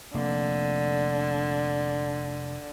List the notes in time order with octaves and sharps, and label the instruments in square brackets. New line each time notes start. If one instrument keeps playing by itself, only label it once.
[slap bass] F1 A#3 [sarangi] D3